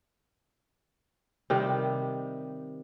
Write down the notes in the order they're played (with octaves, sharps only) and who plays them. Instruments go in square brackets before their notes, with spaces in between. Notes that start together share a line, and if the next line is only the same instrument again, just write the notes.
[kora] C3 D#3 G3